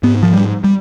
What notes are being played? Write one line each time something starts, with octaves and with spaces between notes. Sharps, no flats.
G#2 B3
F3
G3
G3